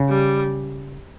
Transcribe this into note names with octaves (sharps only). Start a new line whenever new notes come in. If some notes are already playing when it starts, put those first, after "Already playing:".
Already playing: C#3
G3